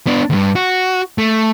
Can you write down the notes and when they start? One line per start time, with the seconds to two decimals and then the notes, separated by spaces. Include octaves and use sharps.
0.07 B3 D4
0.30 D2 G2
0.56 F#4
1.18 A3